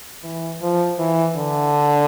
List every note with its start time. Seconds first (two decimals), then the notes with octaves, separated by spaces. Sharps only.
0.24 E3
0.62 F3
0.99 E3
1.37 D3